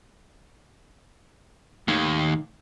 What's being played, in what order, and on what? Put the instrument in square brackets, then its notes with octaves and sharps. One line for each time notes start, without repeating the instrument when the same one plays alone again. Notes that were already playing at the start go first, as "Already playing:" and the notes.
[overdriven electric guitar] D#2 [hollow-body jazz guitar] A2 D#3